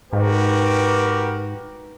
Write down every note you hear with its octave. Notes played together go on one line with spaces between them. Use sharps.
G#2 F#4 G4 A#4 B4